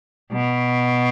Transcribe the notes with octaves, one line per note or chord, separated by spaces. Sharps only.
B2